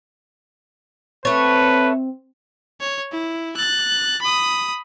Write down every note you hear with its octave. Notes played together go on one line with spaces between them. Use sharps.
A3 C4 B4 C#5
C#5
E4
F#6 A6
B5 D#6